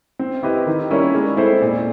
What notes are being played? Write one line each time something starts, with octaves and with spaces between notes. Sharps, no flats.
C4
E4 G4 B4 D#5
D#3
G3 A#3 C#4 E4
G#3
C4 E4 A4 C5
A#2